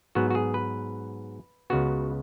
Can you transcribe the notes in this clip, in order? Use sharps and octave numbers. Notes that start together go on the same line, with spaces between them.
G#2 F#3 B3 F#4
F#4
G#4
B4
C#2 C#3 B3 F#4